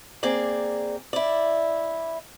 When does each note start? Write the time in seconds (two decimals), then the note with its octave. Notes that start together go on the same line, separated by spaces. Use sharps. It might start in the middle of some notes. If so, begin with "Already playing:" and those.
0.23 A#3 C4 G#4 D5
1.13 E4 D5